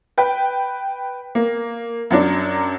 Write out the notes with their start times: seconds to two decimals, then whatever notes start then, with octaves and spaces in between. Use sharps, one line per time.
0.18 B4 G5
1.35 A#3
2.10 F#2 F#3 D4